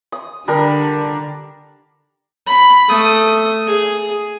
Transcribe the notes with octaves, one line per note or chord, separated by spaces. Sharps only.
D#6
D3 G3 D4 A#4
B5
A3 D#6
G#4